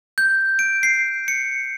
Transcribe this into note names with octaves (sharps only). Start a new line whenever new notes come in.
G6
D7
C7
C#7